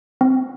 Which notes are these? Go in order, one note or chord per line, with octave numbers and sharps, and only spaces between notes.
C4